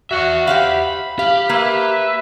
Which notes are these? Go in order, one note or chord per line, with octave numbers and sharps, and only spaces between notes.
F#4 E5 F#5
G4 C5 F5 B5
G4 F5
A#3 B4 E5